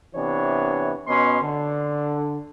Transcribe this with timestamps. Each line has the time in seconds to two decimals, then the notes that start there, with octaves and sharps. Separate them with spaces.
0.15 C3 E3 B3 D4 C#5
1.07 B2 B3 C#4 D#5 C6
1.41 D3